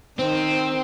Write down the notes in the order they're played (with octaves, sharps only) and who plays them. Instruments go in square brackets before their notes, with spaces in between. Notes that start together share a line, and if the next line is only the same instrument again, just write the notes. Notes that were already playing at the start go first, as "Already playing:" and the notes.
[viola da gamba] D#3 [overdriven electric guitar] C4